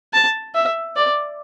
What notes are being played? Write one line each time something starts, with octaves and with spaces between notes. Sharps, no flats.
A5
E5
D5